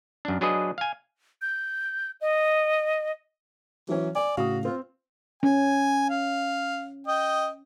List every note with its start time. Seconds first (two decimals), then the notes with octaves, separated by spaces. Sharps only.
0.25 F#2 D4
0.41 F#3 D4 G#4 B4 D#5
0.78 F5 G#5
1.42 G6
2.21 D#5
3.89 E3 F#3 C#4
4.15 D5 G#5
4.37 A2 C#3 F#4 F5 D#6
4.65 C4 F4
5.43 C#4 G#5
6.10 F5
7.07 D#5 G5